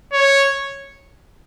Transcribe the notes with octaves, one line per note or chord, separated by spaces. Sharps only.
C#5